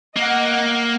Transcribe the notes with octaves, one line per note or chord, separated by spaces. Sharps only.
A#3 D#5 F#5